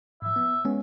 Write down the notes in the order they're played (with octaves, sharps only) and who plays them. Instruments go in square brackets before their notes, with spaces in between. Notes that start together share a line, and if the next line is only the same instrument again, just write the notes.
[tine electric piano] G#2 F3 [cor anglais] E5
[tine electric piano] B3
G#3 B3 C#4